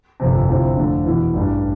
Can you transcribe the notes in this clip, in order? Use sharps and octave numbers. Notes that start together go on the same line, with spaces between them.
G1 F2 C3
D2 C3 F3 C4 E4
F2 D3 F3 A3 D4
E2 B2 B3 E4
A1 G2 E3 G3 D4